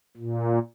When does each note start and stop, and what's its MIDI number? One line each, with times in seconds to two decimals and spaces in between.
0.17 0.58 46